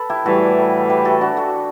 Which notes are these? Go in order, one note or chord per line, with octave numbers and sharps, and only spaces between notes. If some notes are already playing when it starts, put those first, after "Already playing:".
Already playing: A4 B4
E4 G4
A2 E3 G3 F#4 A4
G4 B4
F#4 A4
D4 F#4
F#4 A4